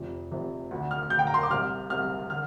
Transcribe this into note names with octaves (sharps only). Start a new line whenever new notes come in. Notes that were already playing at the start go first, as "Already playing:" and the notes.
Already playing: F1 F2 C3
F1 F2 C3
D2 D3
F6
D2 D3 G6
G5
A#5
C6
D6
C2 C3 F6
C2 C3 F6
D3 F6